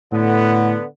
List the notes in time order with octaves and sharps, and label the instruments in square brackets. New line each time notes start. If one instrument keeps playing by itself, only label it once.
[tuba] A2 [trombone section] D3 B3